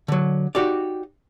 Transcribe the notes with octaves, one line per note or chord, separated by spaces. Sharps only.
D3 F#3
D#4 F#4 G4 D5